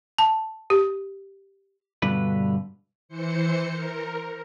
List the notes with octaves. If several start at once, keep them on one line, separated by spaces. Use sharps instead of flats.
A5
G4
G2 B2 D3 B4
E3 C5 C#7
A#4